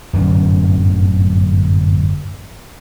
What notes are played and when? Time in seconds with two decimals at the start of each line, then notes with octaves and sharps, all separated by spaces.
0.13 D1 G1 F#2 C#4